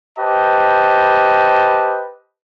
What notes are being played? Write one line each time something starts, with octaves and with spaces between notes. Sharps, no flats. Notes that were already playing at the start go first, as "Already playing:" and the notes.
G4 B4 C5 D#5 A5